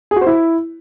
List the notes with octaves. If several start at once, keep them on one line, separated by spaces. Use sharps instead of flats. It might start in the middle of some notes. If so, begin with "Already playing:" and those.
G#4
F#4
C5
E4